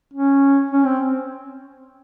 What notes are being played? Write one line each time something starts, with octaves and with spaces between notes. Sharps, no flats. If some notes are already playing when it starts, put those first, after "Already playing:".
C#4
C#4
C4